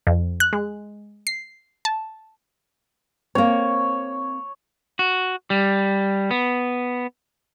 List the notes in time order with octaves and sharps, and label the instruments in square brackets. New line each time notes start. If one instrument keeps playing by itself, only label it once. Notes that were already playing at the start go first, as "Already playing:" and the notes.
[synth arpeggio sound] F2
F#6
G#3
C7
A5
[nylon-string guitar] A#3 C4 [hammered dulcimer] C#5
[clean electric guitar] F#4
G3
B3